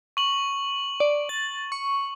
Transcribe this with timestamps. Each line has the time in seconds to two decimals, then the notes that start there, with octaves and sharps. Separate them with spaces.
0.17 C#6 F#7
1.00 D5
1.29 A6
1.72 C#6